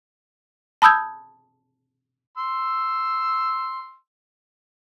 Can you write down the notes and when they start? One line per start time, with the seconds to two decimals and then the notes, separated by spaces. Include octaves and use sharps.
0.82 A5 B5 D#6 E6 G6 G#6
2.38 C6 E6